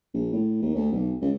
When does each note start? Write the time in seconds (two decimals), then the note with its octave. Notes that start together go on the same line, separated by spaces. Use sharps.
0.14 A#1
0.33 A2
0.62 D#2
0.75 D2
0.92 B1
1.22 C#2